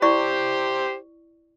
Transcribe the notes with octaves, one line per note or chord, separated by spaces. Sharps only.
E4 G4 C5 D5 C#6